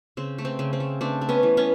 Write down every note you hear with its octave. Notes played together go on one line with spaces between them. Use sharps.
C#3 C4
A3
C4
C#3
C4
A3
A3 C4 D4
A3
B3 C#4
E3
B3 C#4